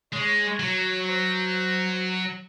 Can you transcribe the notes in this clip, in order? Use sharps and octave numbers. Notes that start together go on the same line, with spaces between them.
G#3 C#5
F#3
C5